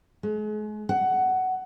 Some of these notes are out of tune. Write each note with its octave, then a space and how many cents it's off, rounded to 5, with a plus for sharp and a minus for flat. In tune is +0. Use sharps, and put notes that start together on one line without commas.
G#3 +40
F#5 +15